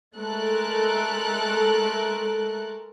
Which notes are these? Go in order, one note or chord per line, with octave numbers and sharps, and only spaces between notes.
G#3 A3 A4 A#4 F#6